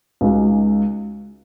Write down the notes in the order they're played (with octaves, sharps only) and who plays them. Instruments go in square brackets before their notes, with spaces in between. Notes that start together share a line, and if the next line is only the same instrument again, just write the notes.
[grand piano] C#2 C#3 G#3 D#4 F#4